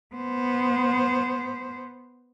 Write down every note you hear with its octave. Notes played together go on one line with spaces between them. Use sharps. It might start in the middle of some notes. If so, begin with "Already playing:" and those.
B3 C5